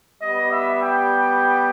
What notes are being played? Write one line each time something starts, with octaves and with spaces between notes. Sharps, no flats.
G3 B3 G4 D#5
E5
G5